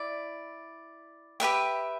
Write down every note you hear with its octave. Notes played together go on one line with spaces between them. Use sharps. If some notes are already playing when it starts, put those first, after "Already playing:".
Already playing: E4 D5
G4 B4 E5 G5